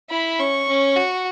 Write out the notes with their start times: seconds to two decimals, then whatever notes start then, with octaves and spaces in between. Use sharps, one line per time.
0.10 E4 B5
0.39 C#4 C#6
0.68 C#4
0.96 F#4